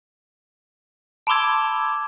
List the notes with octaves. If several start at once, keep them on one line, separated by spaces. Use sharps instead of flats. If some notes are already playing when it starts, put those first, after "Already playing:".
A5 B5 C6 D6 E6 G#6